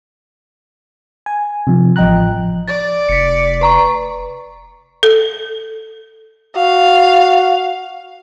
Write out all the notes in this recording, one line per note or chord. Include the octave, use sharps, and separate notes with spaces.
G#5
C3 F3
A1 F3 D#5 G5 A#5 F#6
D5 A6
F1 B6 C#7
B4 A#5 C#6
A4
F#4 F5